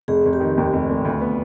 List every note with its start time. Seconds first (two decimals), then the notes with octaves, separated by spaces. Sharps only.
0.08 F1 G#4
0.25 F1
0.33 G4
0.40 D#3
0.58 D#2
0.73 F1
0.89 F1
1.05 D2
1.21 B3